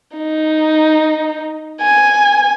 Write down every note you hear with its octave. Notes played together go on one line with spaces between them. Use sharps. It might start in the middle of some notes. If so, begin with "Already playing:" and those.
D#4
G#5